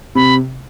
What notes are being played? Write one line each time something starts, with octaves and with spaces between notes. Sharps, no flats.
C3 B5